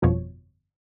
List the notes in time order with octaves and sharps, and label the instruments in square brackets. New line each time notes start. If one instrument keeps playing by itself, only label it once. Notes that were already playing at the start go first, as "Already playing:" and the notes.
[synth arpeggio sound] G1 F2 B2 F3 C#5